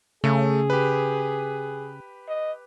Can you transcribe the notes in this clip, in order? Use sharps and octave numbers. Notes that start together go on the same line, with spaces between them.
C#3 A3 G#4
G4 B4
D#5